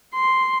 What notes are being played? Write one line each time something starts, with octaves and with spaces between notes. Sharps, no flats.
C6